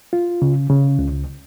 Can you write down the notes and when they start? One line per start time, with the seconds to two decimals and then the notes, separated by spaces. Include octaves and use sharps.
0.13 F4
0.42 C#3
0.70 C#3
0.99 C#2